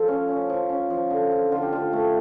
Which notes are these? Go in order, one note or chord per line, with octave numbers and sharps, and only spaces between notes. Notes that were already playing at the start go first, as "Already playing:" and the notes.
Already playing: F3 A4
C#4
C#4
F3
C#4
F3
D3
F3
D3 F4
G4
D3 F4
A3